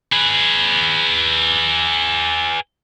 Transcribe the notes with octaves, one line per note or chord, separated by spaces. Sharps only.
G#4 B4